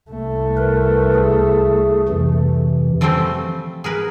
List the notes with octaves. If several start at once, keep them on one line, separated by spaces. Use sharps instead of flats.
C2 A3
A#4 B4
G#4
F2 C3 E3
E3 F3 G3 A3 C4
G#4 A#4 B4